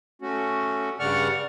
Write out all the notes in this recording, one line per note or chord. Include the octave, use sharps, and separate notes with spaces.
A3 C#4 F#4
G2 C#3 D5 F#5 C#6 F6